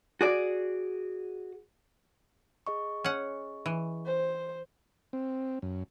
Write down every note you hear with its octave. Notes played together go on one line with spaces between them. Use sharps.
F#4 G#4 D5
G#4 D#5 C#6
C#4 F#5
E3
C5
C4
F#2